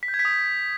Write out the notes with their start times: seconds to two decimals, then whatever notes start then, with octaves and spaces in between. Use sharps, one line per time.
0.03 B6
0.08 G6
0.14 G#6
0.19 B6
0.25 D#6